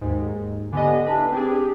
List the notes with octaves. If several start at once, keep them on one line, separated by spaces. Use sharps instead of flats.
D#2 G#2
D3 B3 G4 D#5 G#5
D4 E4 B4 A5
C4 D4 G4 G#4